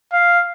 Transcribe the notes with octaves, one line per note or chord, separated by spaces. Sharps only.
F5